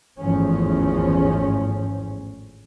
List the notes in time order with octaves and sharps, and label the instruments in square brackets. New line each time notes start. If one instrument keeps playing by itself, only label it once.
[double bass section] G#1 E2 A2 F3 C#4